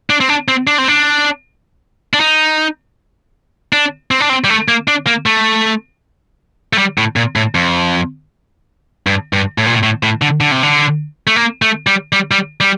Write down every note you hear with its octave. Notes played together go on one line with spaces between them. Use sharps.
D4
C4
D4
C4
D4
C4
D4
D4
D#4
D4
C4
D4
C4
G3
A3
A#3
D4
A#3
A3
A3
G3
A2
A#2
A2
F2
G2
G2
A2
A#2
A2
A2
A2
D3
D3
C3
D3
A3
A#3
A3
G3
G3
G3
G3